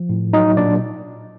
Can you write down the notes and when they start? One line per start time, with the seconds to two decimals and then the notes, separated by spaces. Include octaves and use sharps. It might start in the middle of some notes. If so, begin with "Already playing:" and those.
Already playing: F3
0.09 A2
0.33 F#3 D#4 D#5
0.57 A#2 D4 D5